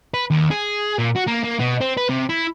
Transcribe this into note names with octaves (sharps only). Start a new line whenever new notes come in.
B4
D#2
G#4
A#2
F#4
A#3
A#3
B2
C4
B4
C3
E4